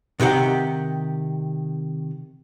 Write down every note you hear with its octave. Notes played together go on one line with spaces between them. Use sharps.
C3 D#3 G4 F#5